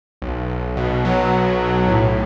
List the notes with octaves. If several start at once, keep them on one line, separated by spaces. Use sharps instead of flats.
B1
B1
B2
F#3
B2
B1
A2